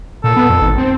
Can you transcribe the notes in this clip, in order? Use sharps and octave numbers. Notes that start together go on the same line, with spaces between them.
A#2 A4
B3
F2
G#1
C4